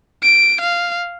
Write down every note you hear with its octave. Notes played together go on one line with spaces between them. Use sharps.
D7
F5